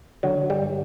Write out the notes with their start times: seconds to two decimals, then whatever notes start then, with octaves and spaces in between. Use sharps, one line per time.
0.23 D3 F#3
0.50 G2 G3